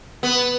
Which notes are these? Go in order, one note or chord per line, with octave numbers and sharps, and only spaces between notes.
B3